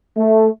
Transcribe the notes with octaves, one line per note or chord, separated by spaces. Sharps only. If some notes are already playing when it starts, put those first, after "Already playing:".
A3